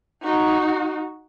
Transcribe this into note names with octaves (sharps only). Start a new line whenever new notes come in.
D#4 F#4